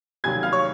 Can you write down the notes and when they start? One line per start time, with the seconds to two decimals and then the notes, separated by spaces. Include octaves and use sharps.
0.24 F1 D#2 D#3 F#3 G#5 G#6
0.43 F5 F6
0.52 C#5 C#6